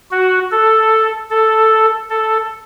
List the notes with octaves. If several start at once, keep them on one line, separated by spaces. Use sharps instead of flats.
F#4
A4
A4
A4